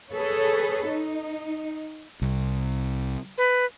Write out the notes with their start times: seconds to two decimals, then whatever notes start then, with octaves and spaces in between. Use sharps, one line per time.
0.11 G#4 A4 B4 C#5
0.88 D#4
2.22 C2
3.38 B4